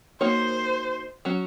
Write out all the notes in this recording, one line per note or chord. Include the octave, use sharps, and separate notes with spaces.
A#3 D#4 F#4 C5 C#5
F#3 C#4 F#4